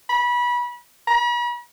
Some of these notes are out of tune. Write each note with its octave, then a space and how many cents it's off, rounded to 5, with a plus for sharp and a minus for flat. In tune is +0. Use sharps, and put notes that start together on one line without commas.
B5 -25
B5 -45